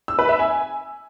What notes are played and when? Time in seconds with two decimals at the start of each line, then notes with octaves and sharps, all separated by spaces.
0.08 E6
0.19 B4
0.29 E5
0.39 G#5